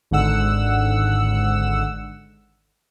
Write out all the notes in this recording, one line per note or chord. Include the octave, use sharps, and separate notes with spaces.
G#1 G#2 D3 F#5 E6